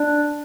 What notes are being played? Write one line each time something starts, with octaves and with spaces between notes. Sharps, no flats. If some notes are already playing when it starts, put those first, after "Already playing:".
Already playing: D4